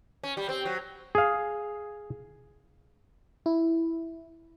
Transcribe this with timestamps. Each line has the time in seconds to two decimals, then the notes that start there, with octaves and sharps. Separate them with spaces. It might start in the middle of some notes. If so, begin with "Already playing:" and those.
0.23 C#4
0.37 G3
0.49 C4
0.65 F#3
1.15 G#4 F5
3.46 E4